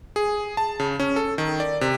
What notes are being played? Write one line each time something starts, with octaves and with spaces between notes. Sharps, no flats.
G#4
A5
C#3
C#4
A4
D#3
D5
C3